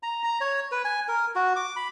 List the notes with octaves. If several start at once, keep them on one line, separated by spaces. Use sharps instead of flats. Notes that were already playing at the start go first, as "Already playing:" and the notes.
A#5
A#5
C#5
B4
G#5
A#4
F#4
D6
B5